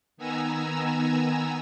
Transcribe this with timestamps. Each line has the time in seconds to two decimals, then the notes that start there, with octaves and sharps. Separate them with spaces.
0.17 D#3 B3 G#5 A#5 E6